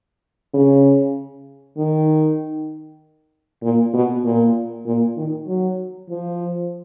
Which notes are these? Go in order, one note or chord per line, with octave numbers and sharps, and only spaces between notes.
C#3
D#3
A#2
B2
A#2
A#2
D#3
F#3
F3